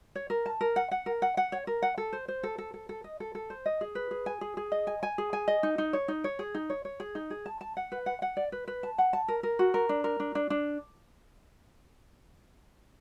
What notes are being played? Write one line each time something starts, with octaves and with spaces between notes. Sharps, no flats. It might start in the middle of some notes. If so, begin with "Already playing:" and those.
C#5
A#4
A5
A#4
F#5
F#5
A#4
F#5
F#5
C#5
A#4
F#5
A4
C5
C5
A4
A4
A4
A4
D#5
A4
A4
C5
D#5
G#4
B4
G#4
G#5
G#4
G#4
D#5
G#5
G#5
G#4
G#5
D#5
D#4
D#4
C#5
D#4
C#5
G#4
D#4
C#5
C#5
G#4
D#4
G#4
A5
A5
F#5
B4
F#5
F#5
D5
B4
B4
A5
F#5
A5
A#4
A#4
F#4
A#4
D4
A#4
D4
D4
D4